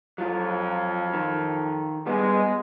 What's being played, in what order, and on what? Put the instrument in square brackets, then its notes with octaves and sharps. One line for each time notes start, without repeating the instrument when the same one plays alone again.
[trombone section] F2 [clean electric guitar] F#3 F4
[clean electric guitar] D#3
[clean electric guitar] G3 B3 [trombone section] G#3